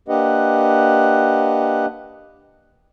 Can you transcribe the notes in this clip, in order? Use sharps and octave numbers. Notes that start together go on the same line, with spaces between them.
A#3 D4 G4 B4 D#5 F#5